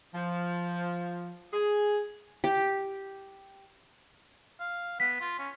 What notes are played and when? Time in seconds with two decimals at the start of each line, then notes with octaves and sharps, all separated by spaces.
0.14 F3
1.53 G#4
2.44 G4
4.60 F5
5.00 B3 B6
5.21 F4
5.38 C#4